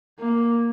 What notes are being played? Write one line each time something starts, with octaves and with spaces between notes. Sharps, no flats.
A#3